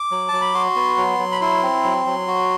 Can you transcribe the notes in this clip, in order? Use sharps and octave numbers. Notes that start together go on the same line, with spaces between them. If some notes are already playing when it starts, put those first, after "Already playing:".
Already playing: D6
F#3
F#3 A5
B5
F#4 C6
B3
F#3
F#3
B5
E4 C6
C4
F#3
F#3
F#4